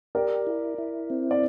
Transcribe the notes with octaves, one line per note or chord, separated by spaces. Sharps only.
G4 A#4 D5
E4
E4
C4
D5